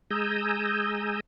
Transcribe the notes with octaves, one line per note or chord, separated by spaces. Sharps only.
G#3 G#5 A#5 D#6 E6 G6